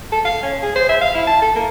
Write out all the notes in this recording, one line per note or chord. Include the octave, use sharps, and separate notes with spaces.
A4
F5
C#4
G#4
C5
E5
F5
E4
A5
A4
A#3